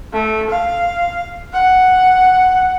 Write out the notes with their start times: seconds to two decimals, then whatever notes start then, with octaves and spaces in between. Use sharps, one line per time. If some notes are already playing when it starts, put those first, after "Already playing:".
0.13 A3
0.50 F5
1.53 F#5